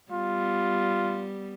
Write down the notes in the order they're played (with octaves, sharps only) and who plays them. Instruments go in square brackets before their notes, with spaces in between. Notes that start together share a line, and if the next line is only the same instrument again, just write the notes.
[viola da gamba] G3 B3 [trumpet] F4